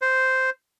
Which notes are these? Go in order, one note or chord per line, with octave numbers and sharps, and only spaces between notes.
C5